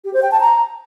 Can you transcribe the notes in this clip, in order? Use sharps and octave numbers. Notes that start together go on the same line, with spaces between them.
G4
C5
G5
A5
A#5